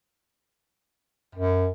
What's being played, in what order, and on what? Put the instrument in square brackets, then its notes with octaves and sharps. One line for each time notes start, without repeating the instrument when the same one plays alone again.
[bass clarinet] F#2